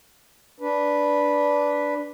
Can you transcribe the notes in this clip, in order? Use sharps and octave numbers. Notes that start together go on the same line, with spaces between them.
D4 B4